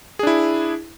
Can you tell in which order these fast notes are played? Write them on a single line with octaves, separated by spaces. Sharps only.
G#4 D4 E4